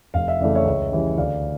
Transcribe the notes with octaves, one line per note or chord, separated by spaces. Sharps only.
F1 F5
E5
F2 C#3 E3 A3 D5
C#5 E5
C#2
C#3 E3 G3
D2 D5 F5